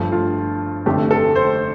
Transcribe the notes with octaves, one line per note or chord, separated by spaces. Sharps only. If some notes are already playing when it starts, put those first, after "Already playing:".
Already playing: G1 G2 F3 A3
F4
F1 F2 D3 A3 G4
A4
C5